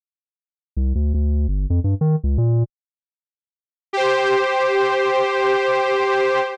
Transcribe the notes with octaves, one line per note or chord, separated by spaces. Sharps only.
C2
D2
D2
G1
F2
G2
D#3
C#2
A#2
G4 C5